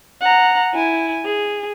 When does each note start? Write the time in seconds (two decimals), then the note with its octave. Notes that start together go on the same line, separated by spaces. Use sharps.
0.21 F#5 A#5
0.74 E4 G#5
1.25 G#4